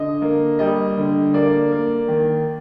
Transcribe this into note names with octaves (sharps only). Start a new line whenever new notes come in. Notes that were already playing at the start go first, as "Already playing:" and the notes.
Already playing: D3 D#5
A#3
G3 D#5
D3
A#3 D5
A#3
D#3